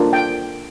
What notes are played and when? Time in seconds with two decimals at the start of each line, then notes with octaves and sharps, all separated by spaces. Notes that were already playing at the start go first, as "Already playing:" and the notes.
Already playing: A#3 D4 F4
0.13 G5